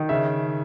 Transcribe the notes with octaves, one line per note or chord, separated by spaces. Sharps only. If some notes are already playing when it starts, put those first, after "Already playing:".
Already playing: D#3
C#3 E5